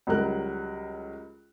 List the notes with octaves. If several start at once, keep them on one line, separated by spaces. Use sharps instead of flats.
C#2 F#3 G3 A#4 F#6